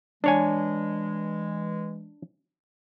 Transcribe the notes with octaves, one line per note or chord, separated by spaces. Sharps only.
E3 G#3 D4 C#5 G#5